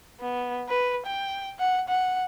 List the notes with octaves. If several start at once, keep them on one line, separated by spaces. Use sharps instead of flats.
B3
B4
G5
F#5
F#5